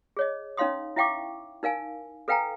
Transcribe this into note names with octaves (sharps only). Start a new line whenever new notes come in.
G#4 C#5 D#5
C#4 D#4 C#5 F5 C6 D#6
E4 E5 F5 G5 C#6 D6
D#4 A#4 F5 G#5
A4 B4 F5 G5 G#5 A#5